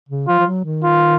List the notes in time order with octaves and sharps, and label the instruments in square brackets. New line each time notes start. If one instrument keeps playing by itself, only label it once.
[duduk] C#3
[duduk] F3 [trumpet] F4
[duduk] F3
F#3
D#3
[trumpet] F4